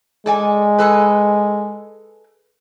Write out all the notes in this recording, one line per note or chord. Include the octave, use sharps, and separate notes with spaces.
G#3 A4 D5 G#5
G#4 A4 B4